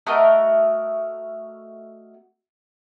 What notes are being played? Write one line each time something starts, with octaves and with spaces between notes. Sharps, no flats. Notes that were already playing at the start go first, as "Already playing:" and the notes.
A3 F#4 A#4 D#5